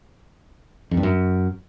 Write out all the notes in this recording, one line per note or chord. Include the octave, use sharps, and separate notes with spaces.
F2
G2
F#2